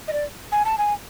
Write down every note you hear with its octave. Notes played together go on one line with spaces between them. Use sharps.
D#5
D5
G#5
A5
G#5